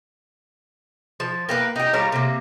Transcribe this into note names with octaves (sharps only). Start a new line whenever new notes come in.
F3
A#3 G4 B4
D#4 G4
G3 A#4 C#5 F5
C3 A#3